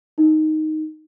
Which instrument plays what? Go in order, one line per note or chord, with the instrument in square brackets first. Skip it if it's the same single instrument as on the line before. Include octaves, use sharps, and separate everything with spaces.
[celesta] D#4